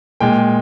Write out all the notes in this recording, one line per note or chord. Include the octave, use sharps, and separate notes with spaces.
A#2 G#3 G5